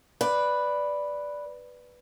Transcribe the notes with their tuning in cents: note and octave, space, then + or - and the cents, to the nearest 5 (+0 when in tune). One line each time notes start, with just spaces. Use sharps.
B4 +0 D5 +0